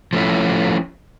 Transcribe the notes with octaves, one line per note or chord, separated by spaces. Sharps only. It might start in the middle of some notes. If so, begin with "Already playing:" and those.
F3 A3 C#4 E4